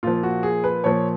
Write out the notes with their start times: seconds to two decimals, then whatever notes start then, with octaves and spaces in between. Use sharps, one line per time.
0.03 A#2 F3 F4
0.23 F#4
0.43 G#4
0.64 B4
0.84 A#2 F3 C#5